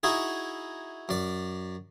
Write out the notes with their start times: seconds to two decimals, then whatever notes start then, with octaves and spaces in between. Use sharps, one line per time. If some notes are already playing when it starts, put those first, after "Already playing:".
0.03 D#4 E4 F#4 G#4
1.09 F#2 D5